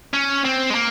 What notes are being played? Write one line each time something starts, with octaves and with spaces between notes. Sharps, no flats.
C#4
C4
G#3
A#3